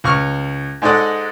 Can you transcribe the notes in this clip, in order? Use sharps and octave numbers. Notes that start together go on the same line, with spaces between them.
C#2 C#6 F6
G#2 G#3 D#4 A4 D5 F#5